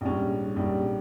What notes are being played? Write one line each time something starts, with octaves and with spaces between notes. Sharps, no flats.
A#1 G#2 G3 C#4
A#1 G#2 G3 C#4